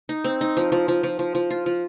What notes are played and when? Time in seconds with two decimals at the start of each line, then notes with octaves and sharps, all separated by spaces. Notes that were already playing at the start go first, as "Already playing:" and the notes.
0.09 D#4
0.24 C4
0.41 D#4
0.57 F3
0.72 F3
0.88 F3
1.03 F3
1.19 F3
1.35 F3
1.50 F4
1.66 F3